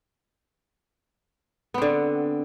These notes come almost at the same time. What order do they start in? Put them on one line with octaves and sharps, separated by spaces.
B3 C4 D3